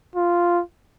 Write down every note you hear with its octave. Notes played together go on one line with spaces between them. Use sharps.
F4